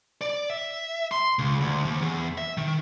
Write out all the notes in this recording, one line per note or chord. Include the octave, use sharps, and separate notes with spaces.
D5
E5
C6
C#2
D2
D#2
E2
E5
D#3